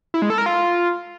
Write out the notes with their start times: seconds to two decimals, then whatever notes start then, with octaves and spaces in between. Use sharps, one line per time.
0.14 E4
0.22 G#3
0.30 A4
0.38 A#4
0.46 F4